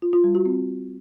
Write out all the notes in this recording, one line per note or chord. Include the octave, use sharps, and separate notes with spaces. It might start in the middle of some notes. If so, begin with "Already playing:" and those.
F4
F4
G3
F#4
C4